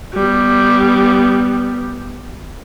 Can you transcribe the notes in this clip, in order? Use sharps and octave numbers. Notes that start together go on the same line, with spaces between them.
G3 B3